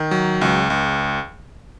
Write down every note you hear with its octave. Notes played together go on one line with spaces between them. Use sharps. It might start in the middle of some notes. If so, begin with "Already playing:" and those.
Already playing: D#3
F#3
C#2
C#2